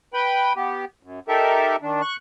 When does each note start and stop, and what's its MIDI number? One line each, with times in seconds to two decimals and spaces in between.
0.14 0.53 71
0.14 0.53 79
0.14 0.53 83
0.56 0.85 59
0.56 0.85 67
1.03 1.20 42
1.28 1.76 63
1.28 1.76 67
1.28 1.76 69
1.28 1.76 70
1.28 1.76 76
1.82 2.01 51
1.82 2.01 62
2.01 2.16 85
2.01 2.16 90